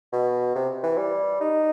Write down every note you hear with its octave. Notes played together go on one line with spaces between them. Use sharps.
B2
C3
E3
G3
D#4